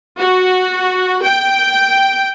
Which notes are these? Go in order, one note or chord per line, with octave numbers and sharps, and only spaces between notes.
F#4
G5